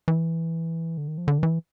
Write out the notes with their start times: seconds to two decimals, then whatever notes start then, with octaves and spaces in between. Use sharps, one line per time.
0.08 E3
0.97 D3
1.08 D#3
1.18 F3
1.28 D3
1.38 D#3
1.43 E3